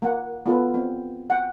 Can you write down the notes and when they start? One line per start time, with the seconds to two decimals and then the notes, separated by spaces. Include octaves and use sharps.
0.02 A#3 F#5
0.46 B3 F4 A4 B4
0.74 C4
1.30 F#5 G5